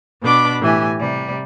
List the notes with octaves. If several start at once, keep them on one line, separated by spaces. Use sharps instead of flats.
B2 D4 B5 D6
A2 E3 G4 G#5
C3 G3